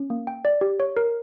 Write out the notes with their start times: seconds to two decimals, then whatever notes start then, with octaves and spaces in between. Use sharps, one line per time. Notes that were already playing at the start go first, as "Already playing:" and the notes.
Already playing: C#4
0.10 A#3
0.27 G5
0.45 D5
0.61 G4
0.80 C#5
0.97 A#4